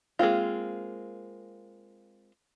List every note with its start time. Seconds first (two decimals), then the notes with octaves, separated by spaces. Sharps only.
0.19 G#3 A#3 C4 F4